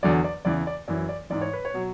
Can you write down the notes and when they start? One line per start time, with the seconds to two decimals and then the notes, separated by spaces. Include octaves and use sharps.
0.03 E2 D3 F#3 D5
0.24 D5
0.45 E2 C#3 E3 D5
0.67 D5
0.88 F#2 E3 D5
1.09 D5
1.30 G#2 E3 D5
1.41 C#5
1.53 B4
1.65 C#5
1.73 B2 F#3